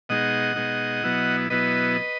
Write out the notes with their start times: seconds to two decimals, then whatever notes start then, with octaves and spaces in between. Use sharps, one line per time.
0.09 B2 G#3 D#4 D#5 F#5
0.56 B2 G#3 D#4
1.04 B2 F#3 B3 E4
1.50 B2 F#3 B3 E4 B4 D#5